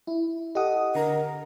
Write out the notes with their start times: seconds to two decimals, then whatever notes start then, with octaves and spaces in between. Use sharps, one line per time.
0.07 E4
0.55 G4 A4 D#5 F#5 D#6
0.95 D3 A#4 A#5